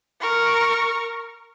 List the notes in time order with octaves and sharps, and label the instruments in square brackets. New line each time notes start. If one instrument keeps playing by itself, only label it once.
[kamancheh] A#4 C#6